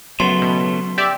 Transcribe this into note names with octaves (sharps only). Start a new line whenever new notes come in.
C#3 F#3 A3 B3 C6
B2
G4 D5 E5